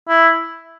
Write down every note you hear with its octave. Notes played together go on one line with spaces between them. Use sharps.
E4